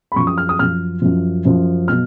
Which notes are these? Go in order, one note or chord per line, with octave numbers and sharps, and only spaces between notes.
B5
F#2 F3 C#6
D#6
F6
D#6
F#2 F3 F6
F#2 F3
F#2 F3
B2 F#3 F6